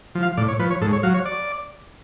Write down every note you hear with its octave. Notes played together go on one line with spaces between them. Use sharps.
F3
F5
A2 D5
C#5
F3 B4
C#5
G#2 A4
C#5
F#3 F5
C#5
D5